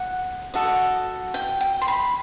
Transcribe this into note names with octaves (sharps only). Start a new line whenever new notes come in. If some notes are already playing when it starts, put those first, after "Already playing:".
Already playing: F#5
F#4 A4 D#5
G5
G5
C6
B5